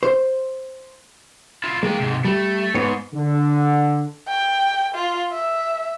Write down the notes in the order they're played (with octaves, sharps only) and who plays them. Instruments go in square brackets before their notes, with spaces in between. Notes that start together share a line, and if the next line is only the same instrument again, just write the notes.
[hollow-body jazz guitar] C5
[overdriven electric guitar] E4 F4
[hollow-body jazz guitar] G#3 [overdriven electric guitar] A#3 G5
[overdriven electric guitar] G#2 C3
[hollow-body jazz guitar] G3 [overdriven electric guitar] A3
[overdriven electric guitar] G#2 [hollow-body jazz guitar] B3 C#5
[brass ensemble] D3
[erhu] G5
F4
E5